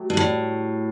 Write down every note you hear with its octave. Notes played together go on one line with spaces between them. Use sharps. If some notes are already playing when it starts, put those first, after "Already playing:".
Already playing: F#3 A3 G4
G2
A2